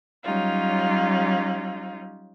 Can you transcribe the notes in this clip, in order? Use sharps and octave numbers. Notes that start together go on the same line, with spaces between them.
F#3 G3 C#4 D#4 F4